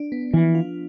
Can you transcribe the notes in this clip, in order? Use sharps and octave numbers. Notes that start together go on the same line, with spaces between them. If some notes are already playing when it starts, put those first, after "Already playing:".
Already playing: D4
B3
E3 F3
F4